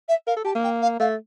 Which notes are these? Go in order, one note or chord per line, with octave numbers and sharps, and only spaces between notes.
E5
A#4 F5
A4
G4 A5
A#3
G5
F5
A3 F5